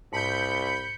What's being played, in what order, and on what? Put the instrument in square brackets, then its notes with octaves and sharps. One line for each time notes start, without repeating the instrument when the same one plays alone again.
[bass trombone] C2 [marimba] G#2 A5 [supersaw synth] B5 G6 [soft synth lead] C#7